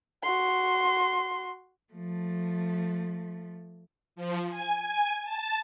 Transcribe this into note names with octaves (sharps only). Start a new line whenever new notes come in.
F#4 C6
F3 A3
F3
G#5
G#5
A5